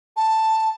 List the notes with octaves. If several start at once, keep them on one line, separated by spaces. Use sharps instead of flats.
A5